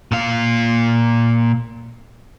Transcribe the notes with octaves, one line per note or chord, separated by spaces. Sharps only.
A#2 F5